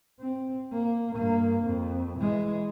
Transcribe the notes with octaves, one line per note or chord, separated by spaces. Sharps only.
C4
A#3
G2 A#3
F2
E3 G#3